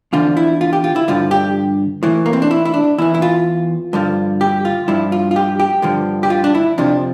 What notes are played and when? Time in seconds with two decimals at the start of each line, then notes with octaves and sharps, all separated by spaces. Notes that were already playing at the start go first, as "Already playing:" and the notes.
0.13 E2 D3 F3 F4
0.37 E4
0.61 F4
0.73 G4
0.84 F4
0.96 E4
1.08 G2 D3 F3 F4
1.31 G4
2.03 A2 E3
2.26 A#3
2.33 C4
2.42 D4
2.51 E4
2.65 E4
2.74 D4
2.98 E2 E3 E4
3.14 E4
3.22 F4
3.93 G2 D3 F3
4.41 G4
4.65 F4
4.88 G2 F3 E4
5.12 F4
5.31 F4
5.36 G4
5.60 G4
5.82 G2 D3 F3
6.23 G4
6.30 F4
6.44 D4
6.55 E4
6.78 F2 C3 F3 D4